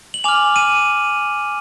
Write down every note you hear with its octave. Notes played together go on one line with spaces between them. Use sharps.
F#7
G#5 D6 F6 F7
D#7